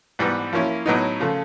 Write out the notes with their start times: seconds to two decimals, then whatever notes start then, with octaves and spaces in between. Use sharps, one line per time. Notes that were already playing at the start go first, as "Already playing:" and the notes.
0.19 G#2 E3 G3 B3
0.53 F3 A#3 C#4 E4
0.86 A2 F#3 B3 D#4
1.20 C#3 F3 A3